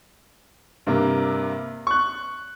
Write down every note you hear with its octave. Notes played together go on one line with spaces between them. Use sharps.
G2 C3 A#3
C#6 F#6